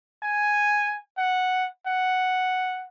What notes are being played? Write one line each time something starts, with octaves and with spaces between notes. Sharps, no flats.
G#5
F#5
F#5